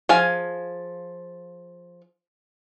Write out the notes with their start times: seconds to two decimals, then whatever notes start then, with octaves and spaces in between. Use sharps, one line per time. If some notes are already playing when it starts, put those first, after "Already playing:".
0.09 F3 G#4 F5 G#5